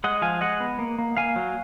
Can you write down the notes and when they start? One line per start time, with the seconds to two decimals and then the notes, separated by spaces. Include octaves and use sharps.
0.04 G#3 D#5 F#5
0.22 F3 F5 G#5
0.41 G#3 D#5 F#5
0.60 B3
0.79 A#3
0.98 A#3
1.17 A#3 F5 G#5
1.36 F#3